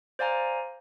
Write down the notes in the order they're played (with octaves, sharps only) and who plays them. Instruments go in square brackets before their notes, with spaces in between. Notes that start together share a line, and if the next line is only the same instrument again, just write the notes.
[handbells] C5 D5 F5 G#5 A#5